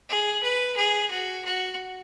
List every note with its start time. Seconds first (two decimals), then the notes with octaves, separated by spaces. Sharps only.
0.09 G#4
0.43 B4
0.77 G#4
1.10 F#4
1.45 F#4